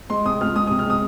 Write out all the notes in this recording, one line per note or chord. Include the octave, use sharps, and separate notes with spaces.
G#3 C6
C3 D#6
C#2 F6
G#3 D#6
D#6
C3
F6
G#3 D#6